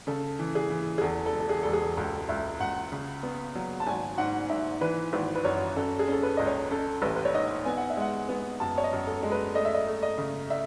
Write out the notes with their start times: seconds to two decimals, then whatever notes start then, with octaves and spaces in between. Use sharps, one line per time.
0.07 C#3 A4
0.39 E3
0.55 G#4
0.70 E3
0.98 G#4
1.02 E2 A4
1.26 A4
1.33 E1
1.40 A4
1.49 G#4
1.63 E1 A4
1.73 G#4
1.97 C#2 A4
2.29 C#2 E5
2.60 C#2 F#5
2.92 C#3
3.23 B3
3.55 F#3
3.80 A5
3.87 G#1 G#5
4.18 G#2 F#5
4.49 G#2 E5
4.81 E3 B4
5.13 G#1 B4
5.35 B4
5.44 F#2 C#5
5.76 C#4 A4
5.99 G#4
6.08 C#4 A4
6.23 B4
6.37 C#2 D#5
6.47 C#5
6.71 C#4 A4
7.02 A1 B4
7.16 B4
7.25 C#5
7.35 G#2 D#5
7.65 B3 G#5
7.77 F#5
7.90 E5
7.97 G#3 F#5
8.29 B3
8.60 F#2 A5
8.78 C#5
8.84 D#5
8.92 F#2
9.07 A4
9.23 G#3
9.32 B4
9.55 A3 D#5
9.65 E5
9.74 D#5
9.87 A3
10.03 D#5
10.18 C#3
10.50 E5